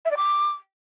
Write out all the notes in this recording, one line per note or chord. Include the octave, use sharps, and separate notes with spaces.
E5
D5
D6